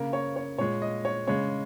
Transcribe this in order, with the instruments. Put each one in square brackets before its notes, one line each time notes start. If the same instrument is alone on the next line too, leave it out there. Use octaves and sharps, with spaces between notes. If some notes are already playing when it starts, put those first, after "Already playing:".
Already playing: [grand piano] C#3 A#3 A#4
C#5
C#5
A#2 G#3 C#5
D#5
C#5
C#3 G#3 C#5